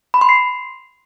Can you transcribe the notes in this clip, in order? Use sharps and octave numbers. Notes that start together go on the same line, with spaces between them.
B5
C6
C7